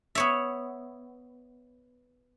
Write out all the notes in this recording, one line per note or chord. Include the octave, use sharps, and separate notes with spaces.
B3 C#5 E5